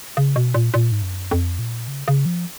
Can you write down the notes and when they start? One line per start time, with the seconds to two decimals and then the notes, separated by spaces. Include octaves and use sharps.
0.17 C#3
0.36 B2
0.54 A#2
0.74 A#2
0.92 G#2
1.02 F#2
1.31 F2
1.59 A#2
1.88 C#3
2.08 C#3
2.26 F3